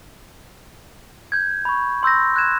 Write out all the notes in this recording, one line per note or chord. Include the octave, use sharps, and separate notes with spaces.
G6 G#6
B5 C#6
C6 E6 G6 A#6
F#6 G#6 E7